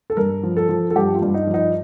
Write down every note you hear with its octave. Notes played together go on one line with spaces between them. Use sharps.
A4
G2 A#4
F3
A4
F3
A4
G2 G4
F4
G2
D#4
F3
D#4